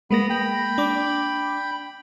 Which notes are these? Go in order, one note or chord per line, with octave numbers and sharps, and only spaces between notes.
G#3 A#3 B3 B5 A#6
G5 B5
D4 D6